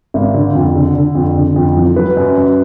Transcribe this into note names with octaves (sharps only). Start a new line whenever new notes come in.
G#1
D3
F2
D3
D3
F2
D3
F2
F3
F#3 B4
F#2
F#2